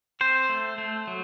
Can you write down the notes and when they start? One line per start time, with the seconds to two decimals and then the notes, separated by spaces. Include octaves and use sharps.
0.21 C4 C5
0.49 A3
0.78 A3
1.07 F#3